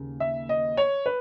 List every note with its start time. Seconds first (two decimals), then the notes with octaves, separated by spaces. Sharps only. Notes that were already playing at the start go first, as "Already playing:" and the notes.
Already playing: D#2 C#3
0.20 E5
0.49 D#5
0.77 C#5
1.06 B4